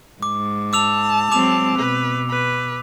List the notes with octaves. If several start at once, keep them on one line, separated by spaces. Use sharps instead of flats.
G#2 D6
A5 D6 E6 F7
F#3 G#3 C4 D6 F7
B2 B4
B4